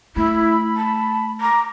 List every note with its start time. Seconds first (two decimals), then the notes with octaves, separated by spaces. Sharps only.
0.16 A3 E4 B5
0.77 A5
1.41 A#5 D6